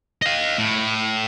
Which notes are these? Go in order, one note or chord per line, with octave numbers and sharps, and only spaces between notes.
D#5 F5
A2